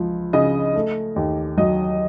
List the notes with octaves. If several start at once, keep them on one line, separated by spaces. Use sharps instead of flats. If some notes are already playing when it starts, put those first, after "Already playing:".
Already playing: C#2 F3
C#3 D#5
A3
D#2
F#3 D#5